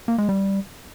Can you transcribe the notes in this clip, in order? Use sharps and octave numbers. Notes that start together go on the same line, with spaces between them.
A#3
G#3
G3